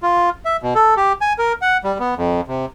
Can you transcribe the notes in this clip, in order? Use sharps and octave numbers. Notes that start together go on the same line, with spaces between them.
F4
E5
B2
A4
G4
G#5
A#4
F#5
G3
B3
F2
C3